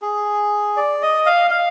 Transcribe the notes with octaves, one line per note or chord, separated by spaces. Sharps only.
G#4
D5
D#5
F5
F5